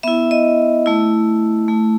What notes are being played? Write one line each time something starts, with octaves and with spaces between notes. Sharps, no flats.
B3 E4 E5
D#5
A3 E4
A3 E4